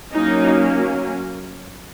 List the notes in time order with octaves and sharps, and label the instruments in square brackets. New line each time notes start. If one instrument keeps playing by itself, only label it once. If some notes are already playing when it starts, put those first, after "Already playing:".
[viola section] F#3 A#3 C#4 D#4